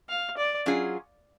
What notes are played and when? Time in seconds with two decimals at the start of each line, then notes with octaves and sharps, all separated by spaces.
0.09 F5
0.37 D5
0.66 F#3 C#4 F4 G#4